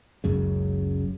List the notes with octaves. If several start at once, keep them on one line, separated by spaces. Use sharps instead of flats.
F#1 C#2 F#2 C#3